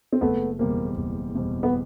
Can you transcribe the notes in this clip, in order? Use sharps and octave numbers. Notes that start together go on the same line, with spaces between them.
C4
F#1 A3 B3
E2 B2 G3 A#3 C4
F#1
E2 B2 G3 C4
B3